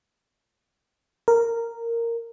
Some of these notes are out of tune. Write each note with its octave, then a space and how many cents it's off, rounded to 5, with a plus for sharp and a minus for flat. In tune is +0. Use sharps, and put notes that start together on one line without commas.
A#4 -10